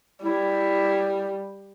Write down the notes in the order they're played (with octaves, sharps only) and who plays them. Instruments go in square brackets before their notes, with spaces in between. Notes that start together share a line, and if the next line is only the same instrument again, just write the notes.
[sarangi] G3 [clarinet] E4